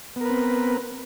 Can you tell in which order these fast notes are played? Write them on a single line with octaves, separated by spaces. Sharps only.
B3 A#4 B4 C4